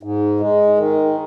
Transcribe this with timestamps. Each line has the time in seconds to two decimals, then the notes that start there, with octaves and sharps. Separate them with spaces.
0.03 G#2
0.40 G#3
0.78 D#3